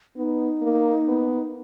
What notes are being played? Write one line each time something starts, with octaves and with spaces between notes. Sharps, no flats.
B3 D#4
A#3
B3